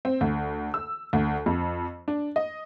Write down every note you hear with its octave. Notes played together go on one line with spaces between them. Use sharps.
C4
D2
E6
D2
F2
D4
D#5